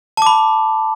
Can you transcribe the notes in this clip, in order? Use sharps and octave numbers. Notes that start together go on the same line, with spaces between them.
A5 B5 D6